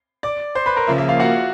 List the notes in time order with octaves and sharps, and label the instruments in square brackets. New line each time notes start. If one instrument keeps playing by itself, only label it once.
[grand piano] D5 D6
C5 C6
B4 B5
A#4 A#5
[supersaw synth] C#3 F3 A#3 [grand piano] E5
[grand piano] E5
F4 F5
F#4 F#5